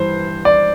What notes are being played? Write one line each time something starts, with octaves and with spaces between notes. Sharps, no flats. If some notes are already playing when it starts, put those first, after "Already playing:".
Already playing: G2 E3 C5
D5